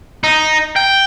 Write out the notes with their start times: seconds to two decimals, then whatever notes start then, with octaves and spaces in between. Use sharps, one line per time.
0.24 D#4
0.76 G5